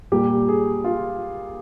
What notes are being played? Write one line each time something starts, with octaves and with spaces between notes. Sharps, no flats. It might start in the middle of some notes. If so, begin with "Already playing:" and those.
A#2 G3 A#3 G4
G#4
F4